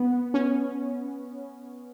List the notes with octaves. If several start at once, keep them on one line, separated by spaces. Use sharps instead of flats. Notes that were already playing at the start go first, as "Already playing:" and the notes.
Already playing: B3
C#4